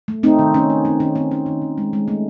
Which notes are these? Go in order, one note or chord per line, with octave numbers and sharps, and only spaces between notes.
A3
A3 C4 D#4
D#3
A3 C#4
A3
A3 C4
D#3 C#4
A3 C4
D#3 C#4
D#3
D#3
G#3
G#3
A3